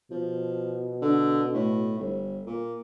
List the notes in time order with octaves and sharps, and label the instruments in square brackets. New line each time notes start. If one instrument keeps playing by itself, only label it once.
[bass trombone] B2 [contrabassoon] F3
[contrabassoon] D3
A2
G1
A#2